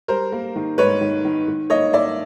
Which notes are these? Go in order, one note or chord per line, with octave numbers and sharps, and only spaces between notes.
G3 A#4 C5
A#3
D#3
G#2 B4 C#5
D#3
D#3
D#3
A#3 C#5 D#5
A#3 D5 E5